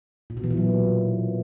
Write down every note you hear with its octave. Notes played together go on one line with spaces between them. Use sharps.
A#2
B2
E3
A#2
F#3